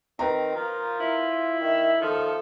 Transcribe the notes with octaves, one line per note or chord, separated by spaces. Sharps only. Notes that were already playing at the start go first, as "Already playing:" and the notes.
D#3 C4 B4 A#5
F3 F4 A#4
E4
D#3 E5
D#3 F3 A4